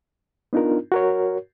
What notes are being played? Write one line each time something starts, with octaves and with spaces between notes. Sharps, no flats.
B3 D4 D#4 F4 A#4
F#4 A#4 C#5